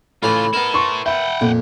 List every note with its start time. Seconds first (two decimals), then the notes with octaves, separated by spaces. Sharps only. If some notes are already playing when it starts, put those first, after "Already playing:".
0.23 A2 C#3 E3 F4 G#5 B5
0.53 B3 E4 A4 A#4
0.74 C6 C#6
1.06 E5 F#5 G5 B5
1.41 F2 A#2